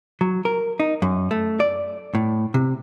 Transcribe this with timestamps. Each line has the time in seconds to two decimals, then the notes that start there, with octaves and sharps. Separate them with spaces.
0.21 F#3
0.45 A#4
0.80 D#4
1.02 F#2
1.31 A3
1.60 D5
2.15 A2
2.54 C3